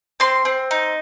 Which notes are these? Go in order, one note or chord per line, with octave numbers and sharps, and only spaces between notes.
C4 C6
C4
D#4